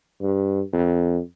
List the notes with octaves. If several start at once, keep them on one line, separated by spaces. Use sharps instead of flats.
G2
F2